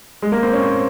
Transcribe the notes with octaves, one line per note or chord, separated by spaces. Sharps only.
G#3
A#3
C4
C#4
C4